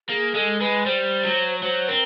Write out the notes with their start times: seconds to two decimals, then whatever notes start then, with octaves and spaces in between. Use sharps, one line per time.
0.09 A#3 G#4
0.35 G#3 A4
0.60 G#3 B4
0.86 G3 C5
1.24 F#3
1.62 F#3 C5
1.88 C4 A#4